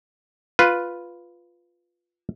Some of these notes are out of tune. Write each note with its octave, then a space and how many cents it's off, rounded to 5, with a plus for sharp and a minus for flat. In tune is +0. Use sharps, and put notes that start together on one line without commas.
F4 +0 B4 +0